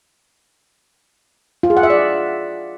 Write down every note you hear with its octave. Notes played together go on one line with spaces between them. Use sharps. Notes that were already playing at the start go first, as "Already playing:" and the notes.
F4
G#4
F#5
E5
D5